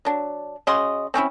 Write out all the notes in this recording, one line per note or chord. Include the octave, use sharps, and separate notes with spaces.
F#3 D4
C#3 F#4 D#5 C6
C4 C#4 D#4 E4